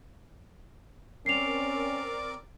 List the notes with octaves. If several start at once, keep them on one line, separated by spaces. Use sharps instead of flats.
C4 C#4 A#4 D5 D6 C7 F7